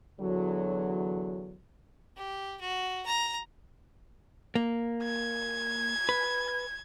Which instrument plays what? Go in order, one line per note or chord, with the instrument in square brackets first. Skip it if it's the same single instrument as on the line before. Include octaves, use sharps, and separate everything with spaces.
[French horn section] E2 D3 F#3
[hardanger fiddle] G4
F#4
A#5
[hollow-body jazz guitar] A#3
[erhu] G#6
[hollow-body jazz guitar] B4